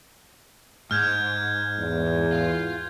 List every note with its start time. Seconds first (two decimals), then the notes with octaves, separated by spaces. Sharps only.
0.91 G#2 F6 G6 G#6
1.78 E2
2.33 F4